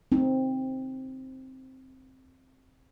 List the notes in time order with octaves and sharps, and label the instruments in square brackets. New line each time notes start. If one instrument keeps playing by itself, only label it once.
[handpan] C4 D#4